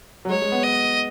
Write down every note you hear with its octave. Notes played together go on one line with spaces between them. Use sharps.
F#3
G#3 C#5
G#3
B3
D#5